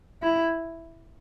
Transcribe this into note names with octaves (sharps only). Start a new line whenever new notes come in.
E4